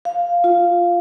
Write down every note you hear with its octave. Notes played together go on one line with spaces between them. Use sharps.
F5
F4